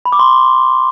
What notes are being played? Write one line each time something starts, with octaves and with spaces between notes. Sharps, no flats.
B5
D6
C6